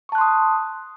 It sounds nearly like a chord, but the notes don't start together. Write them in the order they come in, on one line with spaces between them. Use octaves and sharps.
C#6 A5 F#6 C6 D#6